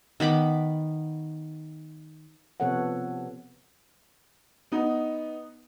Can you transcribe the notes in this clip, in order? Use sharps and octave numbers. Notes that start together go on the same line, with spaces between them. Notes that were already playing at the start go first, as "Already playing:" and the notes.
D#3 B3 B5 D6
C3 F3 B3 A4 C#5 F#5
B3 D#4